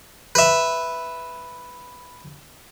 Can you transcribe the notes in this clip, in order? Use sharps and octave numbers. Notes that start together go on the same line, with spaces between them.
B4 E5